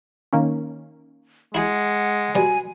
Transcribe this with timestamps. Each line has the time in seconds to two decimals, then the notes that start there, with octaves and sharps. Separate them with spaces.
0.33 D#3 A#3 C#4
1.55 G#3 E4 G#4 F#5 G#5
2.35 B2 G3 G#5